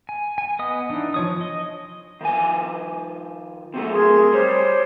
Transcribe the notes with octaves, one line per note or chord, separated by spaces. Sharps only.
G#5
G#5
B3 D#5 D#6
E3 D4 D#4
F3 C#5 D#6
D#5
D#3 F3 G#5
C3 F#3 A3
G#4 A#4 C6
G3 C5 C#5